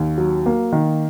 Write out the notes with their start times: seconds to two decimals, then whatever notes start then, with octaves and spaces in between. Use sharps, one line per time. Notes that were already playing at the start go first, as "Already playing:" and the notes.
Already playing: D#2
0.18 F#3
0.46 A#3
0.73 D#3